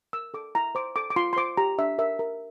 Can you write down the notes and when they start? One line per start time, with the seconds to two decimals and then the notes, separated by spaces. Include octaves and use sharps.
0.13 A#4 E6
0.34 A4 D6
0.55 E4 A#5
0.75 C5 D6
0.96 A4 D6
1.10 D6
1.16 F4 C6
1.33 C6
1.36 C5 D6
1.57 G4 A#5
1.79 D4 E5
1.99 A#4 E5
2.19 A#4